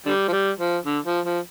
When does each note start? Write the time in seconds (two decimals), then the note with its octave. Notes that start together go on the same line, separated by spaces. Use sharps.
0.06 D3 G3
0.28 F3
0.32 G3
0.59 F3
0.85 D3
1.05 F3
1.25 F3